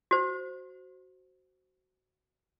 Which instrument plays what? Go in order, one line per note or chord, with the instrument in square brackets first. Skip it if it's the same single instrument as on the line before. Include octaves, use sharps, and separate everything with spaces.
[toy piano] F#4 C5